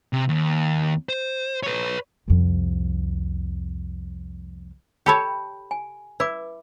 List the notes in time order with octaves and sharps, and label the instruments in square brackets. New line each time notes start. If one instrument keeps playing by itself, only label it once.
[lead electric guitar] C3
D#2
C5
B4 C#5
[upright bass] C2 F2
[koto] G4 A4 C#5 [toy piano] G5 A5 B5
[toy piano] G#5
[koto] E4 [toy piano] B4 D6